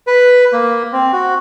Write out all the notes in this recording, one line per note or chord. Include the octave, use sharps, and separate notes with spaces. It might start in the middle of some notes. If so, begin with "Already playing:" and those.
B4
A#3
C4
F#4